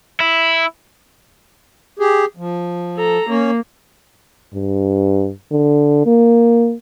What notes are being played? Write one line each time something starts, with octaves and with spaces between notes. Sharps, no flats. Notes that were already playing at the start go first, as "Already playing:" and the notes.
E4
G4 G#4
F3
A4 A#5
A#3 C#4 C#5
G2
D3
A#3